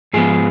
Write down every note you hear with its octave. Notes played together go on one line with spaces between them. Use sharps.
G#2 F3 G#3 B3 G#4